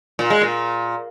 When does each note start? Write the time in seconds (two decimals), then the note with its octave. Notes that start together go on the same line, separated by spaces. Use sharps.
0.19 A#2
0.30 G#3
0.42 A#2